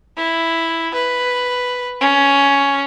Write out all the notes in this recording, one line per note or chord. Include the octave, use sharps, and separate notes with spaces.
E4
B4
C#4